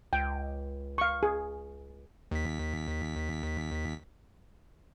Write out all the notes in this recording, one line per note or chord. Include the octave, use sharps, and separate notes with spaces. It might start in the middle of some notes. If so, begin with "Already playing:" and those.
C#2 G5
F5 C#6
G#4
D#2 B6